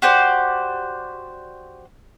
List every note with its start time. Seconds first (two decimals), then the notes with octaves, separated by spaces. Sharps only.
0.02 F#4 G4 C5 D5